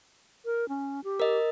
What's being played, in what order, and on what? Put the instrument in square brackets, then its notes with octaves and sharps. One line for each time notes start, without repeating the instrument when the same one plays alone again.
[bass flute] A#4
C#4
G4
[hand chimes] A#4 D#5